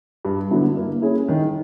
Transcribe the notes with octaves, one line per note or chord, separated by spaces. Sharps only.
G2
D3 F#3 B3 E4
A#3
C#4 E4 G#4
D#3